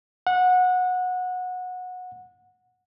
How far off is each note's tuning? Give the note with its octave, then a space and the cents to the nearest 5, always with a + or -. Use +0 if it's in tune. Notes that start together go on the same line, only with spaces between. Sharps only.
F#5 -20